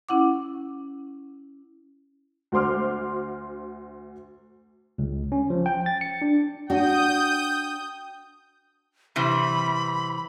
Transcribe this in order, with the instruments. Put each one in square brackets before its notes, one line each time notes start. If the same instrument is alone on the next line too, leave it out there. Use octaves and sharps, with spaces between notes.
[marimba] C#4 E4 F#5 D6
[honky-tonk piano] D2 F#4 C5 C6 D6 F6
[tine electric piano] C#2
C#4
F3
G5
A6
C#7
D4
[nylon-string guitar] D4 F#4 [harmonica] G5 [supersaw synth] D#6 G6
[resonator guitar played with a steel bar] C3 E3 G3 [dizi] B5